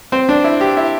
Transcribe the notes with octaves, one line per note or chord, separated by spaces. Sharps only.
C4
D4
E4
G4
E4